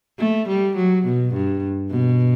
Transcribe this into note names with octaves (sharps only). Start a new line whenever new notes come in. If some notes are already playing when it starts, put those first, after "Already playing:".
A3
G3
F#3
B2
G2
B2